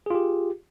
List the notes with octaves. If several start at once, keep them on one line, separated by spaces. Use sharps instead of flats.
F4 G4 G#4